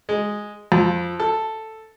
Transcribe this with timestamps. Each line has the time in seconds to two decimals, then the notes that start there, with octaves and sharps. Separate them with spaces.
0.09 G#3
0.72 F2
1.20 A4